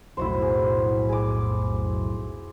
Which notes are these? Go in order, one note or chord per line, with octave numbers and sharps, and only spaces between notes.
B1 F2 A2 E4 F#4 C5
G#4
G#4 D6